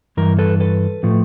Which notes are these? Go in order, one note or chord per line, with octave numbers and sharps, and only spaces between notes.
G2 E3 A#4
A4 B4
A4 B4
A2 F3 A3